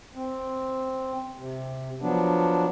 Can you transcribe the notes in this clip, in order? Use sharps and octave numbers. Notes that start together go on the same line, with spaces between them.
C4
C3
F3 F#3 B3 D4